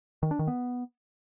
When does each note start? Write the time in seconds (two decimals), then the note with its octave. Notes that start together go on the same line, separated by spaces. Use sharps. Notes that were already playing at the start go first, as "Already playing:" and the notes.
0.23 D#3
0.31 D4
0.39 D#3
0.48 B3